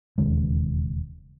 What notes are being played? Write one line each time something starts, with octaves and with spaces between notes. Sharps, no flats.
E1 D#2 C#3 G#3